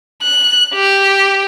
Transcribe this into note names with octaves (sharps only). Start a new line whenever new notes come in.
F#6
G4